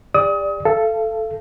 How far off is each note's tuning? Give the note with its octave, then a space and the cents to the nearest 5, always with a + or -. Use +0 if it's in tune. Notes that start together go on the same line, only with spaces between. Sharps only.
G4 +45 D5 +0 D#6 +30
A4 +0 F5 -35